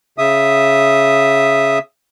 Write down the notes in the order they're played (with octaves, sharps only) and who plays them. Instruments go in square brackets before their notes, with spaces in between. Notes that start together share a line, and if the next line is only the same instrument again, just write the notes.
[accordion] C#3 E5 D#6